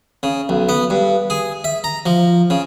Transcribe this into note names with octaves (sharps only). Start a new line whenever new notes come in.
C#3
B1
B3
G2
G#4
E5
A#5
F3
C#3